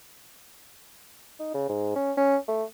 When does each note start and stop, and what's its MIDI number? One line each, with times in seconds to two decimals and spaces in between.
1.40 1.51 63
1.54 1.67 49
1.69 1.92 44
1.95 2.12 61
2.17 2.37 61
2.48 2.63 57